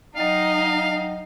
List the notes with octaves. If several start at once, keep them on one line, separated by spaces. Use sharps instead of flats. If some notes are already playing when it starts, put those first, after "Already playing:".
F#3 D#4 D#5 F5 G5